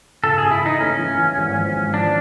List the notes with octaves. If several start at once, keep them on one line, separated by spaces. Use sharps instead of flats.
C#3 A4
C#3 G#4
E4
E3 D#4
A3 C#4
E3
E3
G#1
F3
G#1
F3 D4